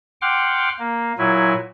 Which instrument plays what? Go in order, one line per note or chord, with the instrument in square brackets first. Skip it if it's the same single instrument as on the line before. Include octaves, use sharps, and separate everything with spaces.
[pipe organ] F#5 G5 C6 D6 F6
A#3
A#2 F#3 E4 G#5